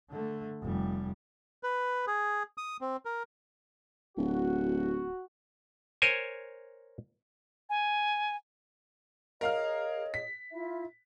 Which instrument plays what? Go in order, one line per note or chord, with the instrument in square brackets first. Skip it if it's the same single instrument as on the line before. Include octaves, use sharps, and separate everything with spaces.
[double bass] D3 A3
F1 G3
[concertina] B4
G#4
D#6
C4
A#4
[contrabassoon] D1 [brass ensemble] F#4
[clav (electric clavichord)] A#4 C5 C#5 G#5
[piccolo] G#5
[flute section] G#4 C#5 D#5 [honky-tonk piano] A#4 F5 F6
[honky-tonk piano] B6
[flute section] E4 F4 E5